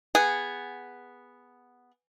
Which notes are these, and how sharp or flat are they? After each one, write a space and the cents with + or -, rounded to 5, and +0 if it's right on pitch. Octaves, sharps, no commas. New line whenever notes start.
B3 +0 G#4 -15 F#5 +0